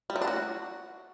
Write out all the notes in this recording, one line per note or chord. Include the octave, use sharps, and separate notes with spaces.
G3
F#3
D4
F#4